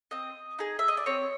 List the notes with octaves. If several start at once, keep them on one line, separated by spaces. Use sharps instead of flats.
C4 D#5
D#4 G#4
E5
D#5
D5
C4 C#5